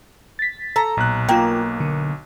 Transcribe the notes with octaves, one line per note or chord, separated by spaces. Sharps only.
A6 B6
A4 A#5
B1 A#2 F#6
A#3 F4 G5
D3